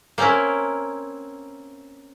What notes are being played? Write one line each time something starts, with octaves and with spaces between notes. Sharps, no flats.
A#3 C4 C#4 E4 A#4